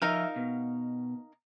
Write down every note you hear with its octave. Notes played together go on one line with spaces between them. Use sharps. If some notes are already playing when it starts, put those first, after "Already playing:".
F3 D#4 A#4 E5 F5
B2